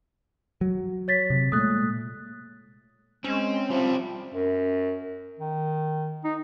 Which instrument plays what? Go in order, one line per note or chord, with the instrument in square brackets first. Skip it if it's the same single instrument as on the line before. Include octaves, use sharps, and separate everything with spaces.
[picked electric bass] F#3
[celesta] C#5 A6 B6
[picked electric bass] C3
[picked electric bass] A#2 G#3 A3 [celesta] D#6 F#6
[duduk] G#3 [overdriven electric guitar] C4 [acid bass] C#4
[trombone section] F3 C4 [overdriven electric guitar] G3 E4 [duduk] F4
[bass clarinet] F#2
D#3
D#4